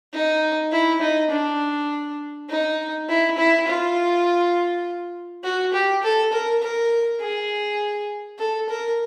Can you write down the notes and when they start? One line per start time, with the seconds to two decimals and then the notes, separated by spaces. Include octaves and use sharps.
0.13 D#4
0.72 E4
1.01 D#4
1.31 D4
2.50 D#4
3.09 E4
3.38 E4
3.68 F4
5.44 F#4
5.73 G4
6.03 A4
6.33 A#4
6.63 A#4
7.21 G#4
8.39 A4
8.69 A#4